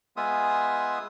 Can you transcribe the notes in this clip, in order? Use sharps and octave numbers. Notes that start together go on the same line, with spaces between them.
G#3 B3 F4 G#4 E5 D#6